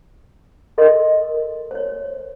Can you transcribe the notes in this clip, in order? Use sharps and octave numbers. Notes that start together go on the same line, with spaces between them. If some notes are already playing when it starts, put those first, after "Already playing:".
A4 A#4 D#5 C6
C5 C#5